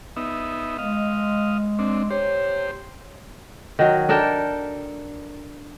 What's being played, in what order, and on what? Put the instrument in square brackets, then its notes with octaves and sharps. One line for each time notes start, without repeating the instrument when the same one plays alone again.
[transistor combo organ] B3 D#4 E5
[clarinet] G#3 [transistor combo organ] D#5 F5
[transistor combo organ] C4 D4
[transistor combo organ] G4 C5 [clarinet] C#5
[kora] D#3 F#3
D4 A4 A#4 G5